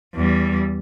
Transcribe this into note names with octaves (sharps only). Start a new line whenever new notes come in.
E2 G3